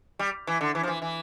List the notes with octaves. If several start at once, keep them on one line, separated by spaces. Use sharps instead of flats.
G3
E3
D3
E3
F3
E3
E3